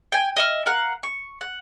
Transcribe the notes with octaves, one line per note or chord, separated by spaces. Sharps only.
G5 G#5
D#5 E5 F6
A#4 F5 F#5
C#6
F#5